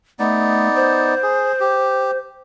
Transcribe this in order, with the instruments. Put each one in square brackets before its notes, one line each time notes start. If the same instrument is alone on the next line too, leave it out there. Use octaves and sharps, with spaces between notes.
[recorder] A3 [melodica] B3 D#4 D5
[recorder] C5
[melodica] G#4
G4